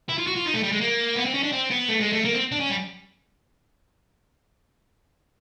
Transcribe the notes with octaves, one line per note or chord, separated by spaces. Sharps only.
E4
F4
F#4
F4
D#4
A3
G3
G#3
A#3
B3
C4
C#4
D4
C4
B3
A3
G#3
A3
A#3
C4
D4
C#4
G3